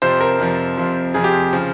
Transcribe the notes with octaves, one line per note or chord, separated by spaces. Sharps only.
F2 C3 F3 C5
A#4
F2 C3 F3
F2 C3 F3
F2 C3 F3 G#4
G4
C#3 F3